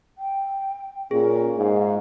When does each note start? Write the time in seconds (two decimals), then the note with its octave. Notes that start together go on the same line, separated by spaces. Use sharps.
0.18 G5
1.11 A#2 C#4 G#4
1.57 G#2 F5